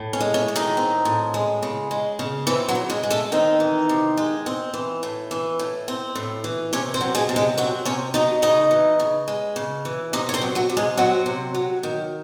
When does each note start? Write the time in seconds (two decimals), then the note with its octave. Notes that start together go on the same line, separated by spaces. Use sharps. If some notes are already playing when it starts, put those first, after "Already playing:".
Already playing: A2
0.13 C#4
0.20 G#3
0.34 C#4
0.48 A2
0.56 D#3 D#4
0.77 C4
1.05 A2
1.34 G#3
1.63 C#3
1.91 G#3
2.19 C#3
2.47 E3 C4 E4
2.68 F#3 F#4
2.75 C#3
2.90 G#3 G#4
3.03 G#3
3.10 A3 A4
3.32 D#3 C4 D#4
3.60 E3
3.89 C3
4.17 G#3
4.46 C4
4.74 E3
5.03 A2
5.31 E3
5.59 A2
5.88 C4
6.15 A2
6.44 E3
6.73 C3 C#4 C#5
6.94 C4 C5
7.01 F#3
7.15 G#3 G#4
7.29 C3
7.36 G#3 G#4
7.58 F#3 C4 F#4
7.85 C3 C#4 C#5
8.14 F#3 D#4 D#5
8.42 C#3 D#4 D#5
8.71 E3
9.00 C#3
9.28 G#3
9.56 C#3
9.85 E3
10.13 C3 D#4 D#5
10.29 C#5
10.34 C4 C5
10.42 F#3
10.55 F#3 F#4
10.70 C3
10.77 G#3 G#4
10.97 F#3 C4 F#4
11.26 C3
11.54 F#3
11.83 D#3